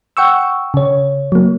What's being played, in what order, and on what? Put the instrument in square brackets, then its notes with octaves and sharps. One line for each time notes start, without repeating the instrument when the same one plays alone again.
[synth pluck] F#5 G5 C#6 E6
C#3 C#5
F#3 A#3